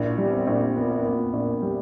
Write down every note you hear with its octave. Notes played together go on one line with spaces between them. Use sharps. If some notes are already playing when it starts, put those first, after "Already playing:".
Already playing: A#1 E4
G3
B3
C4
A#1
A#2 B3
A#3
B3
A#2
A#1
G3